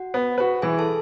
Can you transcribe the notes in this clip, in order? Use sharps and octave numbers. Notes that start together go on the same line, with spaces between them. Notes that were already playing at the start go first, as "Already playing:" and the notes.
Already playing: F#4 F#5
B3
F#4 B4
E3 G#4 G#5
A4 A5